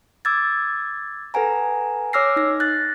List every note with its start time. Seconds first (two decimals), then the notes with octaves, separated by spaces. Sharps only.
0.25 D6 E6 G#6 A6
1.34 A4 B4 F#5 G#5 A#5
2.13 C#5 D6 E6 F6 A#6 C7
2.36 D#4 A#6
2.60 F#6 A6